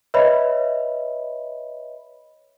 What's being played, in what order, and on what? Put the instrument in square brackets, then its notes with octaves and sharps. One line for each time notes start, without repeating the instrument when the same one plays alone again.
[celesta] B4 C#5 D#5 E5 B5